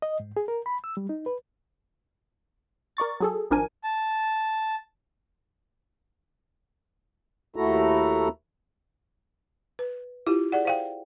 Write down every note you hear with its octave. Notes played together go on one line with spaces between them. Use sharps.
D#5
G#2
G#4
A#4
B5
E6
G3
D#4
B4
A#4 D5 C#6 A6
F#3 G#4 A4
G#1 F3 D4 A#4 G#5 D#7
A5
D#2 A3 E4 F#4 A4 A#5
B4
E4 F4 G4
G#4 D5 F#5
C5 F5 G5